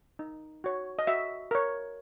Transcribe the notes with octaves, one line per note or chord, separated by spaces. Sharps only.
D#4
F#4 C#5
D#5
F#4 E5
A#4 C#5